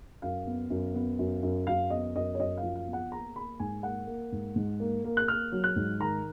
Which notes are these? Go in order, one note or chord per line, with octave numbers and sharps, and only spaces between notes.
F#2 F5
B3
F#2
B3
F#2
F#2
F#2 F5
B3 D#5
F#2 D#5
C#5
F#2 D#5
F5
F3
F5
B3
F#5
A#3 A#5
A#3 B5
G#2 G#5
A#3 F#5
A#3
G#2
G#2
A#3
A#3
F#6
A#3 F6
F#3
F#6
G#2
D#3 A#5